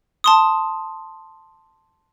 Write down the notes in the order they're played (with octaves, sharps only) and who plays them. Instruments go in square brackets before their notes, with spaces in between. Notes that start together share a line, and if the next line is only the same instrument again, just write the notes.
[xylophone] A5 C6 D#6